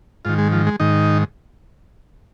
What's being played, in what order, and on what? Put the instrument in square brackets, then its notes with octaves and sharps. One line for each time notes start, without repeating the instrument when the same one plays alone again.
[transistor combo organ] G#2 D#3 F4
G#3
F3
G#3
G#2 D#3 D#4